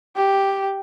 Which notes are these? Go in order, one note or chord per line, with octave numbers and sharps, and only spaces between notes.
G4